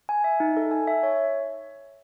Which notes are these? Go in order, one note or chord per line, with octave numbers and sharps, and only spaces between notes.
G#5
E5
D#4
A4
G#5
E5
C#5